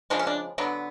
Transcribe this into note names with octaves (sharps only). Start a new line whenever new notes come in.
C#3 F3 G#3 D4
C#4
D4
D3 F#3 B3